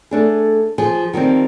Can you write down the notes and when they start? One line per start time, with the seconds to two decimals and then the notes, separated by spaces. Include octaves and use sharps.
0.11 A3 D4 G#4
0.78 F3 G#4
1.13 D#3 F3 G3 C4